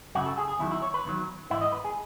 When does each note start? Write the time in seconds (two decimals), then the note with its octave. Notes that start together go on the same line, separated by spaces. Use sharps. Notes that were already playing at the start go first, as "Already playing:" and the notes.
0.15 F#2 C#3 F#3 F#4
0.26 A4
0.38 G#4
0.48 G#4
0.59 E2 D#3 F#3 E4
0.71 E4
0.82 C#5
0.94 B4
1.05 E2 D#3 F#3
1.50 G#2 E4
1.54 E3
1.61 D#5
1.72 B4
1.85 G#4